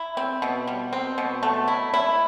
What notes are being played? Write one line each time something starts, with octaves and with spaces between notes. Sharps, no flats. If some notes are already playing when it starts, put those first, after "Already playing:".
Already playing: E4
C4
B2
G3
C4
B2
A3
E4
E4